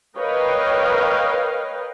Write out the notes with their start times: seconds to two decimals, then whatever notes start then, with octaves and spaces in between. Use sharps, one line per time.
0.18 A#4 B4 C#5 D#5 F5 G5